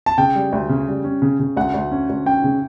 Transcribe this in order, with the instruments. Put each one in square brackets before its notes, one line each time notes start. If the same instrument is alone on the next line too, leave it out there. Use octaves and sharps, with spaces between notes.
[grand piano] A5
[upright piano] C#3 [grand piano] G5
[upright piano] G3
D2
C#3
G3
C#4
C#3
C#3
[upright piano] D2 [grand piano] F#5
[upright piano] D2
C#4
D2
[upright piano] C#4 [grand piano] G5
[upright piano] C#3